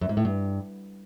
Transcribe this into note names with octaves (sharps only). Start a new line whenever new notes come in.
F#2
G#2
A2
G2